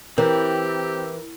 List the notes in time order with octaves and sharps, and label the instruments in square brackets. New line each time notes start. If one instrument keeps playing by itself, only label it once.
[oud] E3 [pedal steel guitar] C4 [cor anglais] G4 [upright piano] A#4